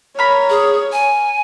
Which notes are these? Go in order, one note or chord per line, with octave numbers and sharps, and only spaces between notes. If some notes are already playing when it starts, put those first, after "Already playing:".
A#4 C#5 B5
G#4
G#5